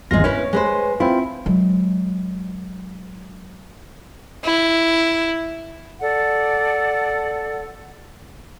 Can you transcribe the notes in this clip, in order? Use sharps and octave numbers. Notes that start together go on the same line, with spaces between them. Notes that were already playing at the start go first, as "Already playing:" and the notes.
G#1 E2 G#3 F4 A#6
C#4 E4 B4 C#5
G#3 B4 C5
C4 E4 F4
F#3 G#3
E4
A4 D5 F#5